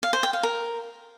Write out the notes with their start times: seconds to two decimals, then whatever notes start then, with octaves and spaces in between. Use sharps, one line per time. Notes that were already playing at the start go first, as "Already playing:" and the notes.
0.03 F5
0.13 C5
0.23 G5
0.33 F5
0.43 A#4